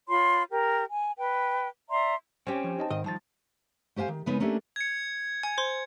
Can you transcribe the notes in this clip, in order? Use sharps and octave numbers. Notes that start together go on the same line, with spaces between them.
F4 C#5 B5 C6
G4 A#4
G#5
B4 G5
D5 E5 A#5 C6
C4 C#4 G4
F3
D#4 D#5 A5
G#2 D#3 D#5
D#3 F3 G3 A5 A6
A3 G4 C5 F5 G#5
D#3
C#3 G#3 B3 D#4 A#4 B4
A3 A#3 C#4 D4 G4 E5
G#6 C#7
G#5 G#6
C5 C6